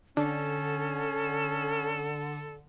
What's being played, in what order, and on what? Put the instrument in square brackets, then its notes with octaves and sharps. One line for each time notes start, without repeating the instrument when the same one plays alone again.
[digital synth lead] D3 [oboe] C#4 [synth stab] D4 [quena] A4